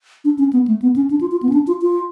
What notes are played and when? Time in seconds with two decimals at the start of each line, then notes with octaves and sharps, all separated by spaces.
0.25 D4
0.39 C#4
0.53 B3
0.68 A3
0.82 B3
0.96 C#4
1.11 D4
1.21 F4
1.31 F4
1.43 B3
1.49 C#4
1.53 D4
1.67 F4
1.82 F4